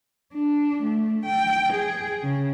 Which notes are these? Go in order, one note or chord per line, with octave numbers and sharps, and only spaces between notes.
D4
A3
G5
G#4
C#3